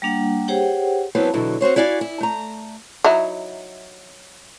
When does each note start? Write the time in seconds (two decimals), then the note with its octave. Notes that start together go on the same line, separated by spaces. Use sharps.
0.02 G3 A#3 D4 F#5
0.48 G4 G#4 C5 C#5 F#5 G5
1.15 E3 F#3 B3 C4 A4
1.34 B2 D3 E3 F#3
1.61 C4 F#4 C5 C#5
1.76 E4 F#4 D5 F5 G#5
2.01 E4
2.21 A3 A#5
3.04 F#3 D#4 E4